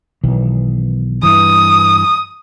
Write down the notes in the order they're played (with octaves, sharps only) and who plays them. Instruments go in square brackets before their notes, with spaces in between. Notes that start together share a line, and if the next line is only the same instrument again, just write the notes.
[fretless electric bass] B1 D#3 E3
[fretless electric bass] G2 E3 [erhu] D#6